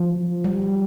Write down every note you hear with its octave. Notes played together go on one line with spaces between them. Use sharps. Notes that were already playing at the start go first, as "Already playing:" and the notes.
Already playing: F3
G3